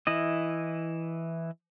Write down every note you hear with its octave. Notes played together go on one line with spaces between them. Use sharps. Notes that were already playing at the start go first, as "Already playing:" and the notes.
E3 E4 D#5